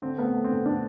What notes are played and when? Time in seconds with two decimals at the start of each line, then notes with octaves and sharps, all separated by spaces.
0.02 D3 C4
0.18 A3 B3
0.23 C4
0.34 A3
0.44 D3 C4
0.66 A3 D4